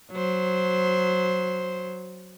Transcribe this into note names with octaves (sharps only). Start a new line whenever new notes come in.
F#3 C5